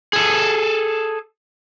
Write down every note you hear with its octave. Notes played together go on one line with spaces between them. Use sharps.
G#4 A4